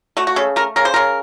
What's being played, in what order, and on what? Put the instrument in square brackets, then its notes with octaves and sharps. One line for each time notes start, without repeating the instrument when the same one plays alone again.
[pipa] A3 F#4
F#4
C#3 A4
A3 A#4
C#3 A#4
C5
C#3 A#4